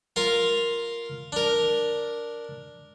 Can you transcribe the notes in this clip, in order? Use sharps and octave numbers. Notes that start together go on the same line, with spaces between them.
F4 A#4 F5
D4 A#4